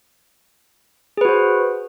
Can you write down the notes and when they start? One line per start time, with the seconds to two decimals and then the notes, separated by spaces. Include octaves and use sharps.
1.17 G#4
1.21 B4
1.25 F#4
1.29 C5